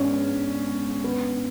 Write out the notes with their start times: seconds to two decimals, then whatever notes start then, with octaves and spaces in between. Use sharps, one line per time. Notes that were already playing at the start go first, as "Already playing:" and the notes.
Already playing: G#2 G#3 B3 C#4 D4
1.04 B3